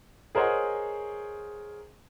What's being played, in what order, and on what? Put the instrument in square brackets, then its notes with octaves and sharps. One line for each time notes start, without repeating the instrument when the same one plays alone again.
[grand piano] G#4 A#4 C5 C#5 D#5 F#5